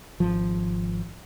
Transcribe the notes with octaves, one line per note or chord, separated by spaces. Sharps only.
G#1 F3